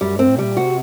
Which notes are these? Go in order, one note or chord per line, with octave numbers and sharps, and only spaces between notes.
F#2 G3
G2 C4
A2
C3 G3
A#2
C3 F#4